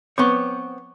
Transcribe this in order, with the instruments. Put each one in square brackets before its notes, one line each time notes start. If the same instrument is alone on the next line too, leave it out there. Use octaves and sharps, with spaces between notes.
[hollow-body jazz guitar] B3 C4 C#5 [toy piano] C#6 D6